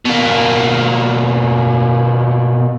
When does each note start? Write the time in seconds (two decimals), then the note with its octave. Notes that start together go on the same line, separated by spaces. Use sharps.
0.05 B2 A#3